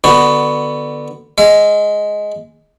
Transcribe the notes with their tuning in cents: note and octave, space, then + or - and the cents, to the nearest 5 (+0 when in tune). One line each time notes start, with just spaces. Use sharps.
D3 +15 B3 +0 F#4 +15
G#3 +5 E5 +45